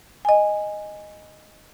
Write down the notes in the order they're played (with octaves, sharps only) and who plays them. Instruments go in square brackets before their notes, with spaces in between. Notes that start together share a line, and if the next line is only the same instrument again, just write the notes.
[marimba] D#5 G#5